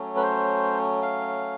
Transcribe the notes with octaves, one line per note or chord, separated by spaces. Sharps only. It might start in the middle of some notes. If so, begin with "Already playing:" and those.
Already playing: F#3 A3 C#4
B4
C5
F5